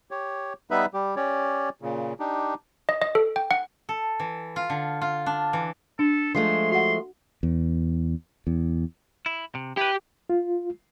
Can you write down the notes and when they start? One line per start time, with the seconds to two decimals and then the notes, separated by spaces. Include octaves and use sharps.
0.11 G4 C#5
0.71 G3 B3 D#4 B4 E5 B5
0.94 G3 G4
1.16 C#4 G4 C#5 D5
1.82 A#2 C#3
2.20 D4 D#4 G4
2.89 D#5
3.02 D#5
3.15 A4
3.36 G5
3.51 F#5
3.89 A4
4.20 E3
4.56 F4
4.70 D3
5.02 F4
5.26 D4
5.53 E3
5.99 D4 A4
6.34 F3 G#3 A3 C6
6.71 F#4 F#5 C6
7.43 E2
8.47 E2
9.26 E4
9.55 C3
9.77 E4 G4 B4
10.30 F4